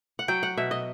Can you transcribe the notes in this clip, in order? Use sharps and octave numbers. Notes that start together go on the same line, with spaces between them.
F#5
F#3 G5
F#5
B2 E5
D#5